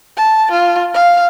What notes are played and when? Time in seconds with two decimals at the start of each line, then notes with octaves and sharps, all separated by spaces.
0.17 A5
0.52 F4
0.94 F5